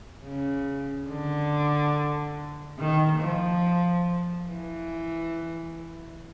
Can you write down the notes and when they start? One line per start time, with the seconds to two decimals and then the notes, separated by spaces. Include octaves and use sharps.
0.24 C#3
1.09 D3
2.79 D#3
3.21 F3
4.48 E3